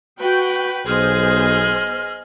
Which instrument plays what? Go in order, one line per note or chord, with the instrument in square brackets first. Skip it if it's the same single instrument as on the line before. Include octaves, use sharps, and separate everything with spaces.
[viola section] F#4 G5 [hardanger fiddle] B4
[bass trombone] B1 [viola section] B3 C5 [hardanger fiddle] G#4 D#5 [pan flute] F6